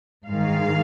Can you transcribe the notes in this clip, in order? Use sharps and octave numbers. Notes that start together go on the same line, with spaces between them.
G#2 D#3 G#3 F5